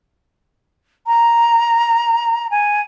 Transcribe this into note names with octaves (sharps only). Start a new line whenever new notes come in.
A#5
G#5